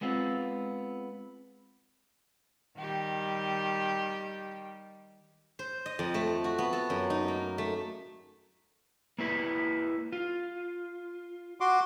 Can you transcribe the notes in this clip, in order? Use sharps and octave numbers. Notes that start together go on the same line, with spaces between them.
G#3 B3 C4 F4
D#3 G3 G4
C5
D#5
F2
A3
F#4
B3
A4
F#2
D#4
A#3
A3
A#3 E4 B4
F4
F#4 C6 D6